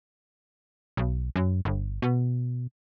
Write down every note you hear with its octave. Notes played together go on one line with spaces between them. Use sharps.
B1
F#2
G1
B2